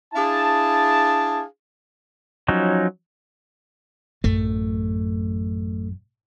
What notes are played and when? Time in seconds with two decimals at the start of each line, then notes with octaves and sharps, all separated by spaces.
0.14 D4 E4 G#4 F5 A5
2.48 F3 F#3 C#4 D#4
4.24 A1 F#2 A3